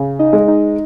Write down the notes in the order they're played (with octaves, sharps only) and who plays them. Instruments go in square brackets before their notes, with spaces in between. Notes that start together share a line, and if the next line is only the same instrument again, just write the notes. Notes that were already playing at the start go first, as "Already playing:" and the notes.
Already playing: [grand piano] C#3
[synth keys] D#4 D#5
[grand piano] G#3
[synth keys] D#4 D#5